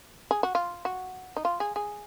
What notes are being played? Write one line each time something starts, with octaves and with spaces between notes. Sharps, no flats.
G#4
F#4
F4
F#4
D#4
F4
G#4
G#4